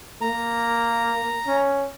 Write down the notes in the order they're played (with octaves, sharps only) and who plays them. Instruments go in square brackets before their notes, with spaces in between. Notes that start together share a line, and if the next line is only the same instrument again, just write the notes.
[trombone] A#3 [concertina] A#5
[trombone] C#4